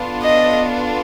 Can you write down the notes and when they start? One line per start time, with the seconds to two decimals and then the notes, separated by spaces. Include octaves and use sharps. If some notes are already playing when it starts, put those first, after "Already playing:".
Already playing: B3 D4 F4 A4
0.22 D#5